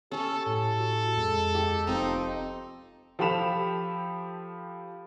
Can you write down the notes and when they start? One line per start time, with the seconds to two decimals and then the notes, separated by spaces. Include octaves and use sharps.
0.12 C#4 G4 A4
0.46 A2 A4
0.78 F#4
1.17 F2 G#3
1.55 G4
1.87 F1 F2 C4 D#4
3.19 F3 G4 A4 B5 E7 F7